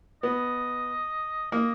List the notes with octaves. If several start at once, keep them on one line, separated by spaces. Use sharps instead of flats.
B3 D#5
A#3 D#5